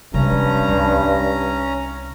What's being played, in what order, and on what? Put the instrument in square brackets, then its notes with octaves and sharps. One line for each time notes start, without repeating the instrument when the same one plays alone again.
[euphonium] G2 [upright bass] C3 G#3 [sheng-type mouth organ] C#4 A#5
[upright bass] C2 D#4